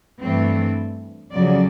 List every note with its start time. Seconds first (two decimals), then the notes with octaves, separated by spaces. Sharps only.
0.20 G2 E3 A3 C4
1.32 F2 C#3 F#3 D5